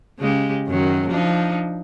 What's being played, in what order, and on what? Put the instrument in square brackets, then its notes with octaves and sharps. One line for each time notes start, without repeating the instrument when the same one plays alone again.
[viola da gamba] C#3 G#3 G4
F#2 D#3 F#3
F3 D4 D#4